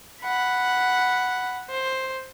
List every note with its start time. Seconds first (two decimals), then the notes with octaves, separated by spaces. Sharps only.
0.22 F#5 B5
1.69 C5